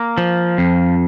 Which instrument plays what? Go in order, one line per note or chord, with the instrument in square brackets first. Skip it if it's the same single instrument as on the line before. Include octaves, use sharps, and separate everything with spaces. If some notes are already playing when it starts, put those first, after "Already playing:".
Already playing: [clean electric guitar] A#3
F3
F2